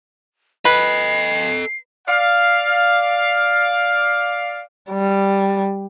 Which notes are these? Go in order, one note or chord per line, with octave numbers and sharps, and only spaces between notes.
A4 B4 D#5 C7
D5 F5
G3